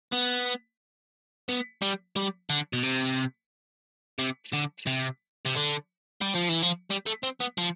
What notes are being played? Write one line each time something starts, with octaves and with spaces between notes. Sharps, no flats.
B3
B3
G3
G3
D3
B2
C3
C3
D3
C3
C3
D3
G3
F3
E3
F3
G3
A3
C4
B3
F3